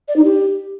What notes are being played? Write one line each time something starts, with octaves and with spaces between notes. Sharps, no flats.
D5
D#4
G4